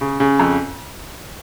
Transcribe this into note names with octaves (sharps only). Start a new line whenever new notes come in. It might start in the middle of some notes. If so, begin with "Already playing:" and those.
C#3
C#3
F2